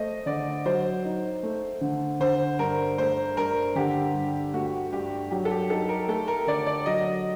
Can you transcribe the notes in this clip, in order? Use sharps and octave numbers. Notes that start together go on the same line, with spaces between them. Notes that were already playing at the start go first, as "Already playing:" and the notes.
Already playing: A3 C5 D#5
D3 D5
F#3 C5
D#4
A3
D3
D3 C5
G2 A#4
A3 C5
G2 A#4
D3 G4
G2
A3 F#4
G2 G4
F#3 G4
A4
G4
D#4 A4
A#4
A3 A4
A#4
D3 D5
D5
F#3 D#5